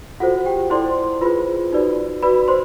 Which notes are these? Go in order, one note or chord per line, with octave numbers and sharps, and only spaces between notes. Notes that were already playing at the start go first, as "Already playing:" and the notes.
F4 F#4 A4 C5 F#5
G4 G5
E4 A4 C5 D5 C6
F4 G#4 B4 C5 B5
D#4 F#4 B4 D5
F#4 B4 D5 B5
C5 C6